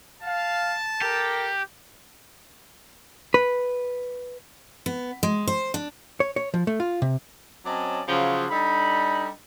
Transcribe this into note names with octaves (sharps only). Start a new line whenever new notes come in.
F5 A5
G4 A4 A#4
B4
B3
G#3
C5
D4
C#5
C#5
F3
A3
F4
C3
F#3 C4 C#4 D5 D#5 A5
C#3 F3 F#3
G3 D4 D#4 A4 B5